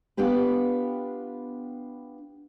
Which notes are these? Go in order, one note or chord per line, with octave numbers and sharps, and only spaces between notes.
B3 D4 F4 G4 B4